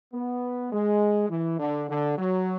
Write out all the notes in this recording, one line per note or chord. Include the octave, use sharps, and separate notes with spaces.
B3
G#3
E3
D3
D3
F#3